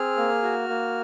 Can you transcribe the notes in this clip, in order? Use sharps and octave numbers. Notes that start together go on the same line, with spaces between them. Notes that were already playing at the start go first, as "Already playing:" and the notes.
Already playing: C4 G#4 F6
A#3
F#4
A#3